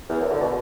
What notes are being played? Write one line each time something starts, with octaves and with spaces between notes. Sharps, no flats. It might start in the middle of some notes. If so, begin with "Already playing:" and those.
E2
F#2
D3
B2